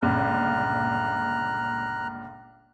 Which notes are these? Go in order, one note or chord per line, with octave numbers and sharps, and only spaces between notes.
G1 C#2 A#2 A#5 F6 F#6